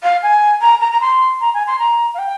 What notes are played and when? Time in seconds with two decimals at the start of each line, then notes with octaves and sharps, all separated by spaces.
0.03 F5
0.23 G#5
0.61 A#5
0.81 A#5
0.92 A#5
1.01 C6
1.41 A#5
1.54 G#5
1.67 C6
1.79 A#5
2.14 F5
2.19 G5